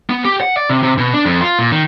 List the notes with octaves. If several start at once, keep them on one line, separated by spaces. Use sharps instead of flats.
B3
G4
F#5
D5
C3
C3
B2
D4
F2
F4
A#2
D#3